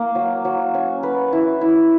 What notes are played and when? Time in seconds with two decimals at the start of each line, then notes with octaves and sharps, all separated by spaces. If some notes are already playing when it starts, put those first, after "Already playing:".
Already playing: A#3
0.15 F#3
0.45 F#3
0.74 C#4
1.03 B4
1.33 E4
1.61 E4